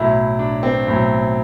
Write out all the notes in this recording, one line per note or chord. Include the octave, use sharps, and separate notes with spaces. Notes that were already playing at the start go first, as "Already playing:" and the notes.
Already playing: B1 A2 F#3 E4
D4
C4
B1 A2 F#3